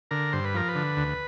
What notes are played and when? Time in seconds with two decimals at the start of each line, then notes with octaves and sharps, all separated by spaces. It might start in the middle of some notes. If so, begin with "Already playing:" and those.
0.11 D3 A#4
0.33 G2 C5
0.45 B4
0.54 F3 A#4
0.68 B4
0.75 D3
0.97 D2